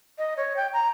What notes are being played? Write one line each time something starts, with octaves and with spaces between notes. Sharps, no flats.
D#5
C#5
G5
A#5